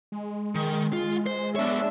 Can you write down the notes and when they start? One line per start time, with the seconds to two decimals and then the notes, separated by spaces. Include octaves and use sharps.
0.12 G#3
0.55 D#3
0.93 F4
1.26 C5
1.56 B3 D4 C#5 E5